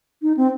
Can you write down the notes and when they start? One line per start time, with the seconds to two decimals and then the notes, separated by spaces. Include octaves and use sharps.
0.22 D#4
0.37 C4